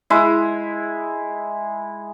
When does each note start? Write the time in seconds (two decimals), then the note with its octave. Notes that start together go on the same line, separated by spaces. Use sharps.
0.10 G#3 E4